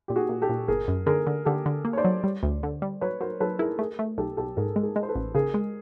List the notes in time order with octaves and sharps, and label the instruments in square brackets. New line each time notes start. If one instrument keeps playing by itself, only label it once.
[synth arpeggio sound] A#2 [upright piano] G4
[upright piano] F#4 G#4
[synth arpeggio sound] A#2
[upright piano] G4 A4
[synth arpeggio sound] A#2
[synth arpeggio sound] G1 [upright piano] G#4 A#4
[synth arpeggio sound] F#2
[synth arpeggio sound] D3 [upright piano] G#4 A#4
[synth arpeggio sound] D3
[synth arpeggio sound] D3 [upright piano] G4 A4
[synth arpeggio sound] D3
A#3
[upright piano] C#5
C5 D5
[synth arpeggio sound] F#3
G3
D2
D3
G3
[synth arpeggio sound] F#3 [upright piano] B4 C#5
[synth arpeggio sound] F#3 [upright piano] A#4 C5
[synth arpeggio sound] F#3 [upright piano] A4 B4
[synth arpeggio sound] E4 [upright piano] G#4 A#4
[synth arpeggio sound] A3 [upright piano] G#4 A#4
[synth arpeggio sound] A3
[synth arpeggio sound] B1 [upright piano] G4 A4
[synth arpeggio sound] B1 [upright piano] G4 A4
[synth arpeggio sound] G#2 [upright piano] G#4 A#4
[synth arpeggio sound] G#3
[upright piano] G#4 A#4
[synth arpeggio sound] G#3
[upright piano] C5
A4 B4
[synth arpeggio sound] A1
[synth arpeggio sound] C#3 [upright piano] G#4 A#4
[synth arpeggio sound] G#3